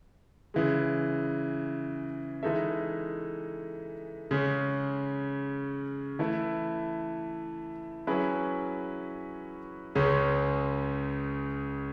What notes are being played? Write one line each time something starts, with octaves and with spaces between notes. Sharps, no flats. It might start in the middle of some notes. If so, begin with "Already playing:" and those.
C#3 E3 G#3
E3 G#3 D#4 A4 E5
C#3 G#3 C#4
E3 A3 E4
F#3 C#4 E4 G#4 B4
C#2 C#3 G#3 C#4